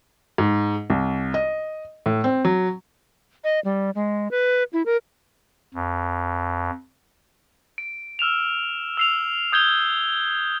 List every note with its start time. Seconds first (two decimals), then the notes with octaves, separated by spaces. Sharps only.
0.38 G#2
0.90 C2
1.34 D#5
2.06 A2
2.24 C4
2.45 F#3
3.44 D#5
3.64 G3
3.95 G#3
4.31 B4
4.73 E4
4.86 A#4
5.74 F2
7.78 D7
8.19 E6 F6 E7 F7
8.97 E6 C7 F7
9.52 D#6 G6 G#6 F7 G7